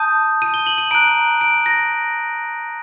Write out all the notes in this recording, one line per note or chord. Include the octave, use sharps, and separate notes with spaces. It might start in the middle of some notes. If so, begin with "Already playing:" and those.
Already playing: A5 D#6 G6
D#7
G7
F#7
D#7
A#5 F#6 D7
D7
A#6